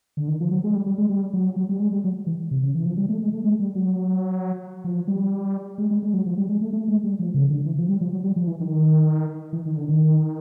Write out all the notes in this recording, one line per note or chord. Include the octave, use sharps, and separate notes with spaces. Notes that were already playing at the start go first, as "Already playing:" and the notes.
D3
D#3
F3
F#3
G#3
G3
G3
G#3
G3
F#3
F#3
G3
G#3
G3
F#3
E3
C3
C#3
E3
F3
G3
A3
G#3
A3
G#3
G3
F#3
F3
G3
G#3
G#3
G#3
F#3
F3
G3
G#3
A3
A3
G#3
G3
F3
C#3
D3
E3
F3
G3
F3
F#3
G3
F3
E3
D#3
E3
D#3
D3
D#3